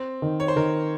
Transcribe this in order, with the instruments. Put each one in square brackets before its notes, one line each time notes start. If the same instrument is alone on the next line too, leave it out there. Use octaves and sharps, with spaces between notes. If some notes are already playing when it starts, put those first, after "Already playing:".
Already playing: [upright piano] C4
[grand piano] D#3
[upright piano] C#5
C5
[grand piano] D#3 [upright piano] A#4